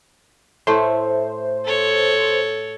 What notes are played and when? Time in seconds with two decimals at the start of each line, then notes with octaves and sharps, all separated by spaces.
0.67 A2 A3 E4 C5
1.65 A4 C#5